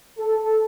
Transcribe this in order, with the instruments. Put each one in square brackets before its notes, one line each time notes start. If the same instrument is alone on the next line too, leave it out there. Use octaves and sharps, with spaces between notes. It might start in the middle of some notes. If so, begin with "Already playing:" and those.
[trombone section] A4